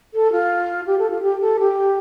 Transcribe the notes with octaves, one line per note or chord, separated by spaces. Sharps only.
A4
F4
G4
A4
F4
G4
A4
G4